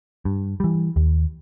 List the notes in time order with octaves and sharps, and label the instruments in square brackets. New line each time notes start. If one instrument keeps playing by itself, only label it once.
[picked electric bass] G2
E3 G3
D#2